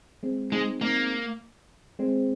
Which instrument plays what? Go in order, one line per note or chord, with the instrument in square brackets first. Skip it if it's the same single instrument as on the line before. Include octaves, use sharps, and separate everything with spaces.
[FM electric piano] G#3 C4
[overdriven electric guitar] G#3 [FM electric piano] C4 D#4
[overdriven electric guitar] A#3 [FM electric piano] C4 D#4
[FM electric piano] G#3 C4